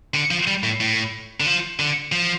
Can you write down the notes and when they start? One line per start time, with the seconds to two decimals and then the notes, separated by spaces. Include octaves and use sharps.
0.14 D3
0.31 F3
0.47 G3
0.63 A2
0.80 A2
1.40 D3
1.46 F3
1.79 D3
2.12 F3